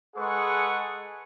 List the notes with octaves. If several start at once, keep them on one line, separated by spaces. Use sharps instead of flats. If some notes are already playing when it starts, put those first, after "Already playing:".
G#3 G#4 A4 B4 F#5 C#6